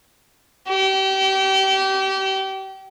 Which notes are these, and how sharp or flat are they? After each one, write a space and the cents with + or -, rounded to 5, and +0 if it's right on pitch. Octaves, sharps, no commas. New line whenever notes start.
G4 -30